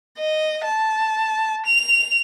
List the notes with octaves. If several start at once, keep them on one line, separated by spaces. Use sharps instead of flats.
D#5
A5
F7